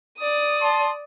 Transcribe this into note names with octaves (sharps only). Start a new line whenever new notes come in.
D5 D#6
A5 C6